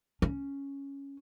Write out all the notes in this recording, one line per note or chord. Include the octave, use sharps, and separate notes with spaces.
C#4